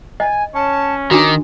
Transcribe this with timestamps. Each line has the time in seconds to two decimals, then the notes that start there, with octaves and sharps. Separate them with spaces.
0.20 D#5 G#5
0.55 C#4 A5
1.11 D#3 D4 F#4 D6